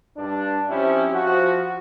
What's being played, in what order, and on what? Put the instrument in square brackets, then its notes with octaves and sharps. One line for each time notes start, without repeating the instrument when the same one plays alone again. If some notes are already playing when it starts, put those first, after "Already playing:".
[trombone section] G2 D4
F3 C4 C#4 E4 G4
F3 F#4